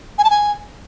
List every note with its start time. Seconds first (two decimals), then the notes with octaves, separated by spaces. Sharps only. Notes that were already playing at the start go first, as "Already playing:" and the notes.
0.18 G#5
0.24 A5
0.30 G#5